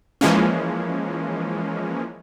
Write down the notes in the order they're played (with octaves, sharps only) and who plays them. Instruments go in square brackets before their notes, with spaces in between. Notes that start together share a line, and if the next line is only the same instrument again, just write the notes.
[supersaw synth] E3 F3 G#3 A#3 C#4